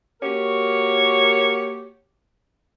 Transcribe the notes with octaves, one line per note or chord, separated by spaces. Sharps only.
A#3 F#4 G4 A#4 C#5